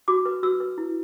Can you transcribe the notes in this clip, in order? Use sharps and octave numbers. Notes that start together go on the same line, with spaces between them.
F#4 D6
B4
F#4 E6
B4
E4